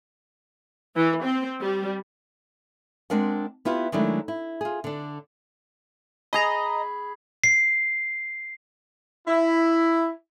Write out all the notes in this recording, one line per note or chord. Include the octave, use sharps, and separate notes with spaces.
E3
C4
G3
G#3 C4 D4 A#4 F#5
B3 E4 F4 G4
D#3 F#3 G#3 A3 D4 E4
E4
F4 G#4
D3 D4
G#4 D#5 A#5 B5
C7
E4